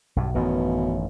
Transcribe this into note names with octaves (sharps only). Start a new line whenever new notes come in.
B1 G2
A1 F#2 B2 D#3